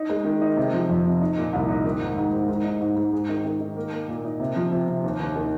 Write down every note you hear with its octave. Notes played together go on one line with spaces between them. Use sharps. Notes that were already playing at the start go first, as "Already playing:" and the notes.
Already playing: D#4
G#3
D#3
D#4
C3
F3
F2
C3
D#4
A#2
C2
D#4
D#3
G#2
G#2
G#2
G#2
D#4
G#2
G#2
G#4
D#3
D#3
D#3
A#3
A#3
A#2
D#4
C3
F3
C3
C3
D#2
D#2
D#3